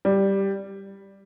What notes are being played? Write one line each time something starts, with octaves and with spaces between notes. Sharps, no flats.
G3